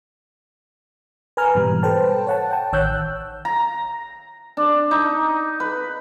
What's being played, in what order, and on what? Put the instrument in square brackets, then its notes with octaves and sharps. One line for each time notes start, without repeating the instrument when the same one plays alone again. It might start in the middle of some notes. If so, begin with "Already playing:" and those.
[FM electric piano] B4 G#5 A#5 F6
G#2 B2 E3 G3
A4 B4 C5 G5 A5
C#5 F#5 A5
G5 A5
A1 D#3 C#5 E6 F#6 G6
[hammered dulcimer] A#5
D4
D#4
B4